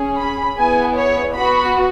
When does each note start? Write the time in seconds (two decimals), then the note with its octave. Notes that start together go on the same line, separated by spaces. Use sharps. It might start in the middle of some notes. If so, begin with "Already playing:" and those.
Already playing: C#4 G#4
0.18 B5
0.57 B3 E4 G#4 G#5
0.96 C#5
1.35 B3 F#4 B5